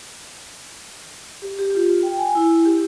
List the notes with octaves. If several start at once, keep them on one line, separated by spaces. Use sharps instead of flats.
G4
G4
F4
G5
G#5
E4
G4